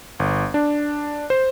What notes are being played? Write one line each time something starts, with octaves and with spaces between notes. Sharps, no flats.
G1
D4
C5